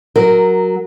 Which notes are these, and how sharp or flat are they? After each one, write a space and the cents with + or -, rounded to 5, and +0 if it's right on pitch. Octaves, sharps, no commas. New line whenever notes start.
F#3 +0 A#4 +0